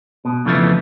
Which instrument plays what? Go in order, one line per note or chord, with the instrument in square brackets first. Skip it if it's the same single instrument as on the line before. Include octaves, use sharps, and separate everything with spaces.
[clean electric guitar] B2
F2 C#3 E3 F3 A3 B3